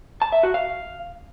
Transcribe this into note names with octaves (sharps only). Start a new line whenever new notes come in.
A5
E5
F#4
F5